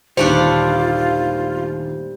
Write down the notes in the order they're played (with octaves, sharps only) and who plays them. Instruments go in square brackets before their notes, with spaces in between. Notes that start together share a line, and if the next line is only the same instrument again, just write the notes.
[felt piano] G1 D#2 A#2 [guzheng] G3 A3 D4 [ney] F4 [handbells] C5